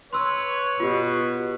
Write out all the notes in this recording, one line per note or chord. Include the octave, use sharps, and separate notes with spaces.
B4 C#5 C6 E6
B2 F4 G4